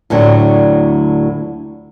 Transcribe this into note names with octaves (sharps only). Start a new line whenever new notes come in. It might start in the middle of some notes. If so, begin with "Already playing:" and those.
D2 A2 D3 F#3